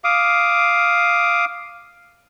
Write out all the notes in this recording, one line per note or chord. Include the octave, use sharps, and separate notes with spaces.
F5 D6 D#6